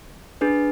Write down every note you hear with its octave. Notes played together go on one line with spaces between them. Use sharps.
D4 G#4 B4